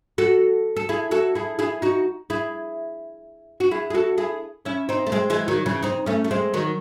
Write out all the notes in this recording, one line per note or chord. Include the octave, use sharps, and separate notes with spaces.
F#4 A4
A4
E4 G#4
F#4 A4
E4 G#4
E4 G#4
D#4 F#4
E4 G#4
F#4
E4 G#4
G#4
F#4 A4
E4 G#4
C#4 E4
C4 D#4
A3
G#3 C4
E3 G#3
D#3 F#3
C#3 E3
C4 D#4
A3 C#4
A3
G#3 C4
D#3 F#3